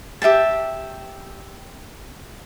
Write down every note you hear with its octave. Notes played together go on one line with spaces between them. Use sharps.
G4 E5 G5 A5